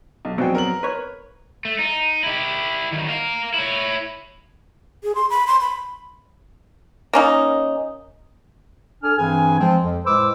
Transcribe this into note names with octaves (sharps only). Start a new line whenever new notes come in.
B1
A#1 F#3 B3 C4 F#4 G5
A#4 F#7
B4 C#5
A3
D#4
E4 G4
D#3 F#3
A#4 F5
E4 C#5
G#4
C6
B5
C6
B5
A#3 C#4 D#4
D4 A4 G#5 F6
G2 E3 C4 G#4 B4 G#5
F3 G#3 C4
F2
A2 G#3 B4 C5 D6 E6